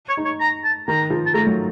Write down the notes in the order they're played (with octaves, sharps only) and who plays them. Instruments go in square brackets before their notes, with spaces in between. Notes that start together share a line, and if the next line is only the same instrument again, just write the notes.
[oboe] C#5
[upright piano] D#4
[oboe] C#5
A#5
A5
[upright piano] D#3 [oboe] A#5
[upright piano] F3
[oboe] A5
[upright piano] A3 [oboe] A#5
[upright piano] F#3